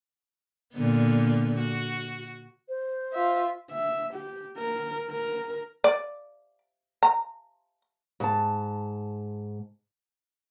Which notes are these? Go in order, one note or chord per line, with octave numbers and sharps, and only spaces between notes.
A#2 D3 B3
F#4
C5
F4 E5
E5
G4
A#4
A#4
D5
A#5
G#2 A5